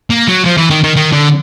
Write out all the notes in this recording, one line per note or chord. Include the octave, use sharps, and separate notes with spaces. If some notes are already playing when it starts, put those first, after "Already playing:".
A#3
F#3
F3
E3
D#3
D#3
D#3
D3